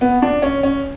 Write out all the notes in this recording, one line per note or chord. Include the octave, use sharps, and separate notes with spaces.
B3
D4
C#4
C#4